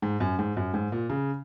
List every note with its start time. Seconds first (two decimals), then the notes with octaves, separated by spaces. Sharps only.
0.02 G#2
0.20 F#2
0.39 G#2
0.57 F#2
0.74 G#2
0.92 A#2
1.10 C#3